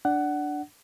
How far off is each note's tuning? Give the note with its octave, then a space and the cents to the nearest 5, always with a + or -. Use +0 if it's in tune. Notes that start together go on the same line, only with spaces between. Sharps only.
D4 +0 F#5 +15